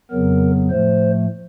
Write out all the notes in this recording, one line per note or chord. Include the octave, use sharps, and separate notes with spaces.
F2 C#3 F#3 B3 A#4
A2 F3 A3 C5